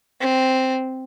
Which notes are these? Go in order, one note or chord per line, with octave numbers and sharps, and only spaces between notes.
C4